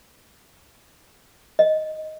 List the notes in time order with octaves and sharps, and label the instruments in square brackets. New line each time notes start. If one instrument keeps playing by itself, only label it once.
[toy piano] D#5